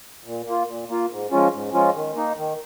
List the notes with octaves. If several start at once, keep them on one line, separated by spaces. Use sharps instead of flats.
A#2
A#3 F4
A#2
A#3 F4
G#2
F3 G#3 C#4 F4
G#2
F3 G#3 C#4 F4
D#3
A#3 D#4
D#3